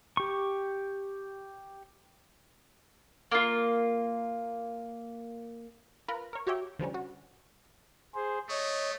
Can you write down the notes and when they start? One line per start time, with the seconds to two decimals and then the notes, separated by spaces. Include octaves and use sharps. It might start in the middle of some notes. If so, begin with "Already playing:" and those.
0.17 G4 C#6
3.31 A#3 F4
6.08 F4 A#4 B4
6.33 A#4 C#5
6.47 F#4 G4 C#5 E5 G5
6.79 D3 F3 G3 C#4
6.94 F#4
8.15 G#4 C5
8.49 A3 C#5 D#5